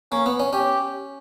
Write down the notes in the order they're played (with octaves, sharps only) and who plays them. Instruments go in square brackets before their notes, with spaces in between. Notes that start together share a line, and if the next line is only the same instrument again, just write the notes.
[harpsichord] A#3 [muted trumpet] C#4
[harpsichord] B3
C#4
[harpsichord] C#4 [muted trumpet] G4